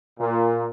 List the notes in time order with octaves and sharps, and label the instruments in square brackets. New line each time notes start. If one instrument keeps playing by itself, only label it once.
[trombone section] A#2